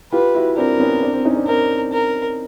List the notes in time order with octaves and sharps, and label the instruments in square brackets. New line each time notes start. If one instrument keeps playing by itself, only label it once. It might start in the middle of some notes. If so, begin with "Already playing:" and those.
[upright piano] F4 G4 [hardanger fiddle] B4
[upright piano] E4 F#4
[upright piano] C4 D4 [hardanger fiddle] A#4
[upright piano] B3 C#4
C4 D4
C4 D4
C#4 D#4
C4 D4
[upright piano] C4 D4 [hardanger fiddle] A#4
[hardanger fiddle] A#4